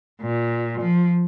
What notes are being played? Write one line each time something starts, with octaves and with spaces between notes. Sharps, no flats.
A#2
F3